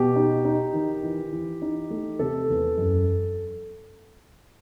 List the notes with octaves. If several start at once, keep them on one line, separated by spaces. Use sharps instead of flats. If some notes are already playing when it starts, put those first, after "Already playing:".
Already playing: B2 G4
D#4
D#4
D#3
E3
E3
D#4
A3
C3 A4
E2
F#2